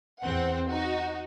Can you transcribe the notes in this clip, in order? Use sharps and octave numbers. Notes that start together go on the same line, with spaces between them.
E2 C4 F#5
D#4 F#4